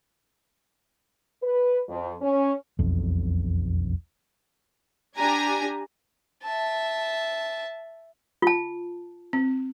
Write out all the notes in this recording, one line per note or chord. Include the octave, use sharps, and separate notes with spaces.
B4
F2
C#4
E1 B1 F2
D4 G4 G#5 A#5
E5 A5
F4 A5
C4